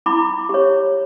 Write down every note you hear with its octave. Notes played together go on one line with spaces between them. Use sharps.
E4 B5 D6
G4 C#5